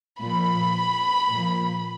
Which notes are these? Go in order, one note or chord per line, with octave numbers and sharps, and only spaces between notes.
A#2 F3 B5
A#2
F3